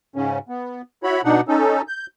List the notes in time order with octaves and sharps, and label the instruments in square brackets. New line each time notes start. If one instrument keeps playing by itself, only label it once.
[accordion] G#2 C#3 C#4
B3
E4 F#4 C#5 B5
B2 D4 D#4 F#5
C#4 D#4 A4
G6